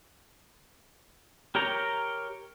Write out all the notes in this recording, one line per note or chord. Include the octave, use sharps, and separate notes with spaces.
G4 A#4 C#5 G5 A#5